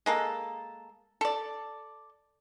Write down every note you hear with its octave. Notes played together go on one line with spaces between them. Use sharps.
G#3 A#3 A4
A4 D5